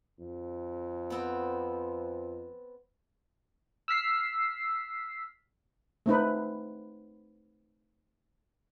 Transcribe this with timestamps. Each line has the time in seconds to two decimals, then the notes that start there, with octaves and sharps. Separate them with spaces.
0.20 F2
1.10 B3 C4
3.88 E6 F6 B6 C7
6.06 A3 C4 D#4 B4